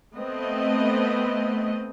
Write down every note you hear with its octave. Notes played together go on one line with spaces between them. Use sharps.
A3 B3 C4 D#5